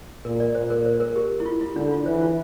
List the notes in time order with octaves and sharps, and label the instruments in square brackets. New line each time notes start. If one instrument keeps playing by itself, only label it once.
[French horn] A#2 [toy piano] A#4
[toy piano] D5
[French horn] A#2 [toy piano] C5
[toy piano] A#4
C5
A#4
G4
E4
F4
E4
[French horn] D3 [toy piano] D4
[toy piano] F4
[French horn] E3 [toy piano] C5
[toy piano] F4